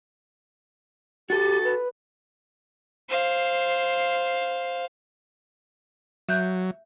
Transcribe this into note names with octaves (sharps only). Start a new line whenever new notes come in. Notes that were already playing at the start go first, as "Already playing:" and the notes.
F#4 G4 A4 A6
B4
C5 F5
F#3 E5 F#6 G6